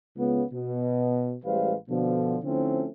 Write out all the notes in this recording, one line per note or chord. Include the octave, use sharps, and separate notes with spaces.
C#2 C#3 B3
B2
A1 G3 G#3 B4 C5 F5
B2 D3 F3
D3 F3 A3 C4 C#4 E4